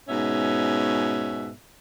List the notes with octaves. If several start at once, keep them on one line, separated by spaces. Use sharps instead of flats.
G#2 B2 C#4 E5